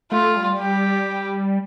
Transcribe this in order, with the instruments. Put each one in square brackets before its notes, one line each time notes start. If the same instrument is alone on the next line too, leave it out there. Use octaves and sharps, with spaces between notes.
[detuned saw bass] A3 [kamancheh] F4
[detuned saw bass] G3
[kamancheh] G4